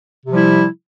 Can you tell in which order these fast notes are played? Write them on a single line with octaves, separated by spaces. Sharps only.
C3 F3 G3 E4